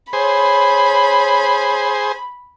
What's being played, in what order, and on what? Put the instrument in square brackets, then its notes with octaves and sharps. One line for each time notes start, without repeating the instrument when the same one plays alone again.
[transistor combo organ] G#4 C5 [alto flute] C#5 [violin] B5